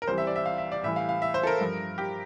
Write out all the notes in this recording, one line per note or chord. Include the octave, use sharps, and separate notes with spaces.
A#4
C2 C3 E3 G3 C5
E5
D5
E5
F5
E5
D5
A2 E3 G3 E5
F5
F5
E5
C5
A4
A#4
G2 F3
G4